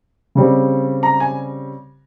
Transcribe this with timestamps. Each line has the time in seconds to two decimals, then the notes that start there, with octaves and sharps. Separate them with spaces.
0.35 C#3 G3 C4
1.03 A#5
1.20 G#5